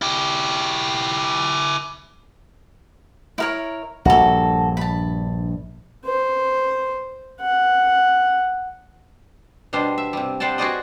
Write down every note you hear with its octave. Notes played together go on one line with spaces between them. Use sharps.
E4 G4
E4 A#4 C#5
A#1 G2 F#4 A4
A5 B5
C5
F#5
B2 G3 D4 C5
E5
C3 G3
C3 G3 C5 F#5 G5 A5
F#4 G#4 B4 C5 D5 D#5